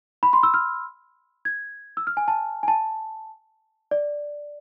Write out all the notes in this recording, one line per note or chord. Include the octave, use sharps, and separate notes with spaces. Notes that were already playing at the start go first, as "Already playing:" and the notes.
B5
C6
E6
F6
G#6
E6
F6
G#5
A5
G#5
A5
D5